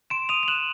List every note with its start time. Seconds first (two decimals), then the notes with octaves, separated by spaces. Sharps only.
0.10 C6 D7 E7
0.29 D#6 D#7 F7
0.43 F7
0.48 F#6 E7 F#7